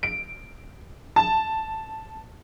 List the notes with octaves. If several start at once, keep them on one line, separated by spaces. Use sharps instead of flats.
D7
A5